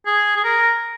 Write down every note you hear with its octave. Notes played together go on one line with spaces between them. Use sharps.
G#4
G#4
A#4